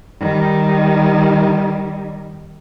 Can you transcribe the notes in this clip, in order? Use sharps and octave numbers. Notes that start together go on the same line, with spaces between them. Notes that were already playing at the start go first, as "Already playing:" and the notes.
D#3 G3